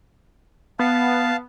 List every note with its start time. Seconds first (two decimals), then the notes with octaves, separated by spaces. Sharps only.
0.79 B3 F5 A5